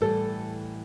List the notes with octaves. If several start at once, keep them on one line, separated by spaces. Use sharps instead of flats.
A2 E3 G3 A4